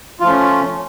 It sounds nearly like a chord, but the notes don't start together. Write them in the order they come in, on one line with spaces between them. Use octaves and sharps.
F4 F3 A3 C#4